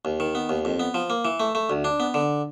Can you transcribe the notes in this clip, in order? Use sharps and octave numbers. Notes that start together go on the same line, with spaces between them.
D#2
D#3
B3
D#2
F2
B3
F3
A#3
E3
A3
A3
D2
D4
B3
D3